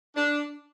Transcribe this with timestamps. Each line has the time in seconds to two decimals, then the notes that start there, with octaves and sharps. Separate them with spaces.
0.17 D4